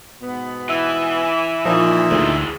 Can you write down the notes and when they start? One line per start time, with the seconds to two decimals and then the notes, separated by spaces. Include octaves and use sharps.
0.22 G#2 B2 B3
0.69 E3 E5
1.65 A#2 F3 D#4
2.11 D2 E3 G#3